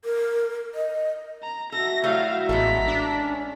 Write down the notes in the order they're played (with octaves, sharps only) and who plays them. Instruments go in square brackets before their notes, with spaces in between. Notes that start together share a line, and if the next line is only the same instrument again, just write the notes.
[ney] A#4
D#5
[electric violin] A#5
[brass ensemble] F#4 E5 [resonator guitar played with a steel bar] A4 [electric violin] A#6
[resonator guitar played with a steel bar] F#3 G3 A3 [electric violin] E4 F5
[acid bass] A1 [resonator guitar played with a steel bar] G#3 B3 A4 [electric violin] A#5 B6
[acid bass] D4
[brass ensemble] C#4